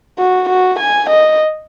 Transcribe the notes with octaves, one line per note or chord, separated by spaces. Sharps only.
F#4
F#4
G#5
D#5